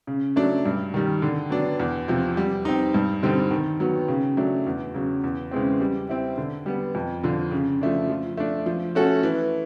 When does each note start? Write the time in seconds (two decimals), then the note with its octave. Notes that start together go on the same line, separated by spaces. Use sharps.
0.07 C#3
0.36 F#3 A3 D4
0.66 G2
0.94 D#3 G3
1.22 D3
1.50 F#3 B3 D4
1.80 E2
2.08 C3 F3
2.37 G3
2.65 C4 D#4
2.94 G2
3.23 D3 G3 C4 D#4
3.51 D#3
3.80 F#3 B3
4.08 C#3
4.37 F#3 A3 D4
4.66 E2
4.94 C#3 F#3
5.24 E2
5.51 C#3 E3 G#3 C4
5.81 G3
6.09 C4 E4
6.38 D3
6.66 G3 B3
6.95 F2
7.23 D3 F3
7.52 C#3
7.81 F3 A3 D4
8.09 F3
8.37 A3 D4
8.66 F3
8.95 A3 C#4 F#4 A4
9.23 E3